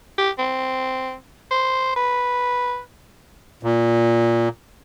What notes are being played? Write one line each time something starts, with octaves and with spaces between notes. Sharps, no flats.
G4
C4
C5
B4
A#2